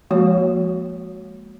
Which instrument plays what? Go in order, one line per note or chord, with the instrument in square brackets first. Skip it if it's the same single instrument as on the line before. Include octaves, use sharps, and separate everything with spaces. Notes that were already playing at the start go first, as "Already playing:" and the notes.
[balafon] F3 G#3 A#3 F#4 C#5